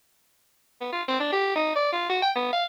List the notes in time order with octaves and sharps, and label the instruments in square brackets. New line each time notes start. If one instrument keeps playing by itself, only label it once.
[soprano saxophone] B3
F4
C4
D4
G4
D#4
D5
F4
F#4
G5
B3
F5